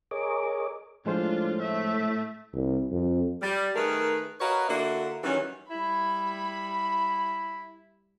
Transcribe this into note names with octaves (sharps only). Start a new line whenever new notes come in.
G#4 A#4 C#5 D#5 D6
A2 F3 G#3 D4 F4 C5
A3 E5
C2
F2
G3
D#3 A3 D#4 G#4 A#4 B4
F#4 A#4 B4 C#5 D#5 F5
D3 A#3 D4 E4 F#4 E5
D#3 E3 F#3 G3 C#4
G3 E4 B5